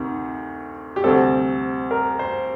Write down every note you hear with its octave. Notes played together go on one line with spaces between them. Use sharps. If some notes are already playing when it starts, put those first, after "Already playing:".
Already playing: D2 C3 D#3
G4
D2 C3 G3 C4 A4
A#4
C5